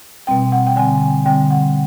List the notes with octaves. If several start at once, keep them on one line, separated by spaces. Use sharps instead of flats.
B2 G3 C4 G5
F#5
G5
D3 G3 C4 G#5
D3 G3 C4 G5
F#5